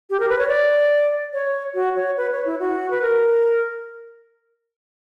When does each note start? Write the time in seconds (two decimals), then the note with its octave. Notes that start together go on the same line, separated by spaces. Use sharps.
0.10 G4
0.20 A#4
0.29 B4
0.39 C#5
0.48 D5
1.33 C#5
1.74 F#4
1.96 C#5
2.17 B4
2.32 C#5
2.46 E4
2.60 F#4
2.91 B4
3.02 A#4